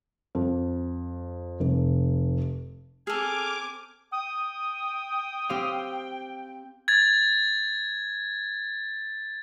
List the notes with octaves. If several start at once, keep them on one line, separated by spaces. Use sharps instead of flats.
F2
F1
C4 G#4 A4 G#5 D6 F6
G5 D#6
C4 G4 F5
G#6 A6